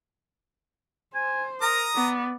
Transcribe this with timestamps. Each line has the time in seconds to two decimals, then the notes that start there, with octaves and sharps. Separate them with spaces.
1.15 C5 G#5
1.62 A#4 A#5 D#6
1.95 B3 D5